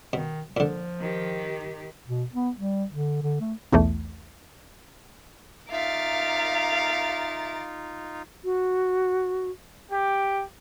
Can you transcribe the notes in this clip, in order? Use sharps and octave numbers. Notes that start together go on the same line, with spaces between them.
B2 D#3
A#2 D3 F3
D#3 G4
B2
B3
G3
D3
D3
A3
B1 E2 E3 A3
D#4 F4 E5 F5 A#5 D6 A6
F#4
G4